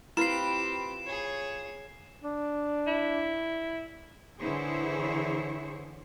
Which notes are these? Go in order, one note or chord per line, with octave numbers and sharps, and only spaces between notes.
C4 E4 F4 G4 B4 C7 E7
G#4 C#5
D4
E4
D3 E3 E4 G#4 C5 C#5